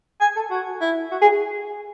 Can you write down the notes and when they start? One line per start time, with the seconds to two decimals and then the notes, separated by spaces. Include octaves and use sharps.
0.21 G#5
0.36 A4
0.51 F#4
0.81 E4
1.12 F#4
1.22 G#4